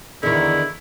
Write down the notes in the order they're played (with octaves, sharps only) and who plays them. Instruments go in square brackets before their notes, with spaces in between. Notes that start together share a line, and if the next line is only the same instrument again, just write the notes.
[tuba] E2 [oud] D3 D#3 [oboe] E4